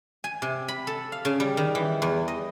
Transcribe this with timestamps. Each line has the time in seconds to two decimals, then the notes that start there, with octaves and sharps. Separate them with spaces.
0.24 G#5
0.42 C3
0.68 B5
0.87 A4
1.12 F5
1.25 C#3
1.40 G3
1.57 D#3
1.75 E3
2.02 E2
2.28 D#5